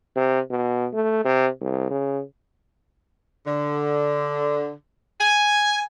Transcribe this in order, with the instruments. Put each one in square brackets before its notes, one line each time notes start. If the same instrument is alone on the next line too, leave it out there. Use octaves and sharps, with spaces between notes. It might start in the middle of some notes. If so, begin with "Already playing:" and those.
[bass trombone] C3
B2
A3
C3
C2
C#3
[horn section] D3
G#5